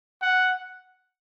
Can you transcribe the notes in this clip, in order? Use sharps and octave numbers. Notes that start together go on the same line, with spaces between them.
F#5